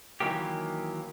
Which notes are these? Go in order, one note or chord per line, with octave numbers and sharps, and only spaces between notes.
D#3 E3 F#3 A#3 G4